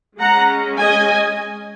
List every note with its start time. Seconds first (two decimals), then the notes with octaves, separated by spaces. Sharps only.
0.19 G#3 C#4 F#5 A#5
0.78 D#5 G#5